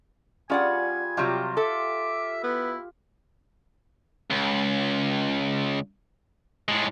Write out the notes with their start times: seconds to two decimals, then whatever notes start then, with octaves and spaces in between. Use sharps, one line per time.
0.50 G3 C#4 F4 G#4 D5 F#5 G#5
1.17 C3 F#3 G3 F4 G4 C6
1.57 A4 E5 D6
2.43 B3 E4
4.31 C#2
6.68 A2 G#3